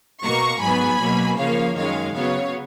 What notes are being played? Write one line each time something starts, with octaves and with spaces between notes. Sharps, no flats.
B2 A#3 A#5 C#6
G#2 F#3 B3 G#5 B5
B2 F#3 A#3
C#3 F3 A#3 C#5 F5
F#2 D#3 G#3 C#5 F5
C#3 F#3 B3 C#5 F5